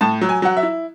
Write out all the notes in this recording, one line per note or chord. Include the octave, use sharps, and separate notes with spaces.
A2 A5
F#3
G#5
F#3 F#5
E5
E4